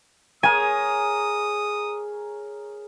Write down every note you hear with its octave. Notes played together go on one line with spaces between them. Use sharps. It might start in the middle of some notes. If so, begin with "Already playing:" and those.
G#4 A#4 C#5 G#5 D#6